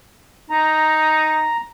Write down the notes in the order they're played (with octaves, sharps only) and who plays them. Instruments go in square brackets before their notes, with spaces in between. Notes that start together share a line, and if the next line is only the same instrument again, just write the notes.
[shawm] D#4 [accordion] A#5